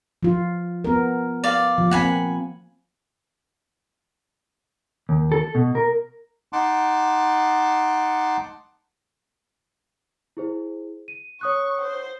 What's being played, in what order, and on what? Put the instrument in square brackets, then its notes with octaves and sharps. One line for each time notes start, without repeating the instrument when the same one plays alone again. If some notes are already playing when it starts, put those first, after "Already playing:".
[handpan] F3 F4
B3 A#4
[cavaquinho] D5 F5
[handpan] F3
[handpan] A#3 C4 [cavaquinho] F#5 G#5 B5
[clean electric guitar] D#2
A4
B2
A#4
[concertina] D#4 F#5 A5 C6 D6
[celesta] E4 G#4 C5
D#7
[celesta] C#5 D#6 F#6 [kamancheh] C#6
[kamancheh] C5